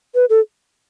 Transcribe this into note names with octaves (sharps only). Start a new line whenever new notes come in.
B4
A4